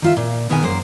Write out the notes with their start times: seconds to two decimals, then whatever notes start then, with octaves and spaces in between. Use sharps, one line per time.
0.02 D#3 F4 E5
0.17 A#2
0.50 B2 D#3 B3 G#4 G#5
0.63 F#2 A#3 C5